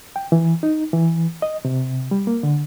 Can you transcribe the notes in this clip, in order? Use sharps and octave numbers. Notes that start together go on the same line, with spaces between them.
G5
E3
D#4
E3
D#5
C3
G3
A#3
D3